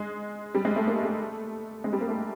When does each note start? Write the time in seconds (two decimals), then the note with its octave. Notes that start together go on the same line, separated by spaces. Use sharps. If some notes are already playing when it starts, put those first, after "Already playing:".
Already playing: G#3
0.55 G3
0.65 G#3
0.76 A3
0.87 A#3
1.03 A3
1.84 G#3
1.93 G3
2.01 A#3
2.08 A3